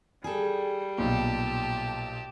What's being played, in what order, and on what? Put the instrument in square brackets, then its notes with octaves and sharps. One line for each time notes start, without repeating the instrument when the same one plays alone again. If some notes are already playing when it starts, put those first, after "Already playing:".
[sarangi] G3 [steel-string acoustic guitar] G#4 A4
[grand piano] B1 A#2 [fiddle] G4 A5